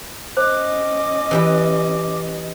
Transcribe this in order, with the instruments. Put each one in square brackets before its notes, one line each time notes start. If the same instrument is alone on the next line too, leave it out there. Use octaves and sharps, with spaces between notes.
[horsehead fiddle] C#4 D#5 [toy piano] C5 [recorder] D6
[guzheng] E3 G4 B4